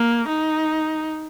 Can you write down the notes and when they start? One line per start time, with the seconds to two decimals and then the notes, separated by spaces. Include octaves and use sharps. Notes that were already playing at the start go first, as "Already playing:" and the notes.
Already playing: A#3
0.29 D#4